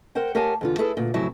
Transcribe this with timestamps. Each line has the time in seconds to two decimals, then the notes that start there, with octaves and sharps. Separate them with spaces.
0.15 A#4 C5 F#5 G5
0.35 G4 A#4 C#5 F5 G#5 A5
0.61 E2 D3 F4
0.78 E4 G#4 A4 B4
0.97 D2 A#2
1.14 F2 A2 C#3 F#3 E4